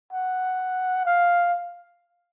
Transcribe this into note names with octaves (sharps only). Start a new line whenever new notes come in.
F#5
F5